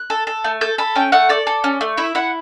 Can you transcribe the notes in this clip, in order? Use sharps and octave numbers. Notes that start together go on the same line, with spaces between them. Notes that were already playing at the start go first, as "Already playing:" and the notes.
Already playing: F#6
A4
A4
A3
A4 G6
A4 B5
C#4 G5
A3 F#5
A4 D5
A4
C#4
A3
E4 E5
E4 F#5